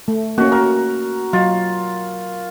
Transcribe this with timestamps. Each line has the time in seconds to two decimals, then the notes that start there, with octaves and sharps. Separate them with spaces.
0.08 A3
0.38 A#3 C#4 F#4
0.52 A#4
1.33 F#3 F4